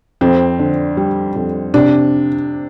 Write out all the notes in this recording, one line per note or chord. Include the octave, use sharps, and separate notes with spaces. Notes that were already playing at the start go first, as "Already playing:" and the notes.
F2 C4
D3
G3
F2
C3 D4